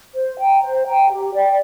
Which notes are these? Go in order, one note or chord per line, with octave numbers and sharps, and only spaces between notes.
C5
G5 A#5
C5
G5 A#5
G4
D5 G5